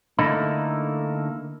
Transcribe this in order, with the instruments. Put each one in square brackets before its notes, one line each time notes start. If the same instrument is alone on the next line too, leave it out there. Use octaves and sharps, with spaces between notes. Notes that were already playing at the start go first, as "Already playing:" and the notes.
[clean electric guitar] D3 A3 A#3 D#4 E4